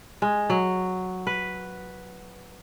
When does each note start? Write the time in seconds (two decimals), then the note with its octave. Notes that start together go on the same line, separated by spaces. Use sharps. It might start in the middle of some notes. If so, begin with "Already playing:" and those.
0.22 G#3
0.50 F#3
1.27 B4